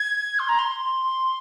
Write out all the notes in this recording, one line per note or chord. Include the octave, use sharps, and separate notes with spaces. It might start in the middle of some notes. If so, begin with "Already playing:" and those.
Already playing: G#6
C6
A#5
C6